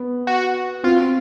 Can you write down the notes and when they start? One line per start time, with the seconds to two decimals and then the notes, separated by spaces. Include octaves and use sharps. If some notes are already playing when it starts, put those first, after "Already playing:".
Already playing: B3
0.27 F#4
0.84 C4 F4